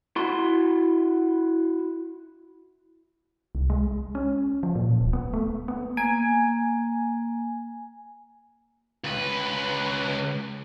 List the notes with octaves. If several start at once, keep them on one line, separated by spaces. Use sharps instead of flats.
E4 F#4 C6
C2
G#3
C#4
F3
A#2
D1
B3
A3
B3
A#3 G#5
C#2 B4